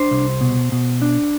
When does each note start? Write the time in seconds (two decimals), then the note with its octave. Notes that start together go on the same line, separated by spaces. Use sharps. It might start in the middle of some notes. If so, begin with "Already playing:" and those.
Already playing: D4 C5
0.11 C2
0.41 B2
0.72 B2
1.02 D4